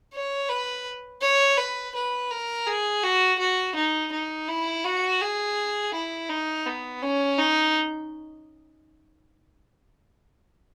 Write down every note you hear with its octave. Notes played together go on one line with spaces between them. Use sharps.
C#5
B4
C#5
B4
B4
A#4
G#4
F#4
F#4
D#4
D#4
E4
F#4
G#4
E4
D#4
B3
C#4
D#4